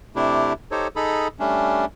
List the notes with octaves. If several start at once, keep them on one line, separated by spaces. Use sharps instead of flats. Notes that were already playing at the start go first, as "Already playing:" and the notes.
C3 A3 D4 E4 G4
D#4 G4 A4 C5 C#5
D#4 G#4 A4 B5
G3 A3 C#4 D4